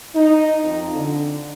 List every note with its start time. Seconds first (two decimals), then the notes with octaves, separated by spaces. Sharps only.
0.15 D#4
0.64 F2
0.95 D3